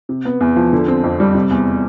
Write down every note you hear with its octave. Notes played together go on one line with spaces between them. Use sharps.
C3
B3
E2
F3
D3
C4
F2
G3
C3
E2